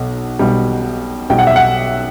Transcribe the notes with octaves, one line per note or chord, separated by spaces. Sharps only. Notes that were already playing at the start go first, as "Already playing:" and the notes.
Already playing: B1 B2
B1 B2 G3
B1 B2 G3 G5
F#5
E5
F#5